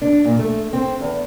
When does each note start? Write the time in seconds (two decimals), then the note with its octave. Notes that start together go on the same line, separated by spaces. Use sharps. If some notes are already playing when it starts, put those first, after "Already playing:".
0.02 D4
0.25 A#2
0.39 A3
0.73 C4
1.01 E2